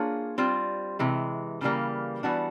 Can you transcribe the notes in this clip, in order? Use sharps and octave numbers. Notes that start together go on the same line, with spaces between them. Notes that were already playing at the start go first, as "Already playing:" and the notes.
Already playing: A#3 D4 F4 G#4 C#5
G3 C4 F4
C3 E3 G#3
C#3 E3 G3 A#3
E3 G3 B3 D4 F#4